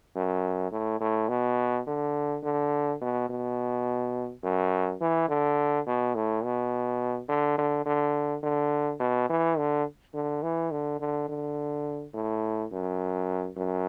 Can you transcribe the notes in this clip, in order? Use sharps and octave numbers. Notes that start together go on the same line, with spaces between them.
F#2
A2
A2
B2
D3
D3
B2
B2
F#2
E3
D3
B2
A2
B2
D3
D3
D3
D3
B2
E3
D3
D3
E3
D3
D3
D3
A2
F#2
F#2